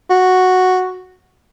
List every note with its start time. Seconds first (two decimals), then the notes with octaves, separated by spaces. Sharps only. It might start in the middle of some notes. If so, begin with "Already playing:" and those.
0.10 F#4